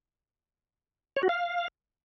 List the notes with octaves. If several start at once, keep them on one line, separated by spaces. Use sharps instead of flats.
C#5
F#4
F5